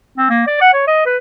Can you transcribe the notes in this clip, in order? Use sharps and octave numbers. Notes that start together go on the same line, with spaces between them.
C4
A#3
D5
F#5
C#5
D#5
B4